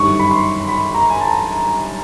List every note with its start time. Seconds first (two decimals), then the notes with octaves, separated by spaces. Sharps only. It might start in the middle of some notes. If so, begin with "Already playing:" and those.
Already playing: G1 F#2 D#3 G3 C#6
0.19 B5
0.31 C6
0.68 B5
0.94 A#5
1.10 G#5
1.21 A5